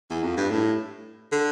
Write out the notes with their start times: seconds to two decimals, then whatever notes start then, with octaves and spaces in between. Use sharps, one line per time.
0.10 E2
0.24 F2
0.37 G2
0.51 A2
1.32 D3